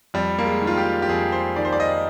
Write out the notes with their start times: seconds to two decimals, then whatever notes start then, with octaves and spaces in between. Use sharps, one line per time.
0.14 F2 G3
0.39 A#3
0.46 G#3
0.61 D#3
0.67 F4
0.78 G4
1.02 G4
1.09 F2 G#4
1.32 C5
1.56 D#3 D5
1.65 C5
1.73 D5
1.80 D#5